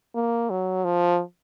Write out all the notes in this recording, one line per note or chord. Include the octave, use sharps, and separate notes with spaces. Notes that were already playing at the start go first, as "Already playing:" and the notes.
A#3
F#3
F3